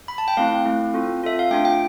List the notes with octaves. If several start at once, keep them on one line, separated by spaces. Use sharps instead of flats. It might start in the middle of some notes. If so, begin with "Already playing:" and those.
B5
A5
G5
A3 C4 E4 F5
A3 C4 E4
C4 F4 A4
C4 F4 A4 E5
F5
A3 D4 F4 G5
G5